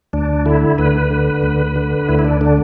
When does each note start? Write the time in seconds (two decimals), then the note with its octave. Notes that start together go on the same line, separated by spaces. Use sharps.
0.13 D2 D4
0.46 D3 E4
0.78 D2 B4
1.11 D3
1.43 D2
1.76 D3
2.08 D2 E4
2.19 E4
2.25 D4
2.41 D3 D4